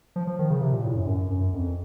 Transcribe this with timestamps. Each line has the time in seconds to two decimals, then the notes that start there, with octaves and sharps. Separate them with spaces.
0.16 F3
0.27 F3
0.39 D#3
0.50 C#3
0.61 C3
0.72 A#2
0.84 A2
0.96 F#2
1.07 F#2
1.30 F#2
1.53 F2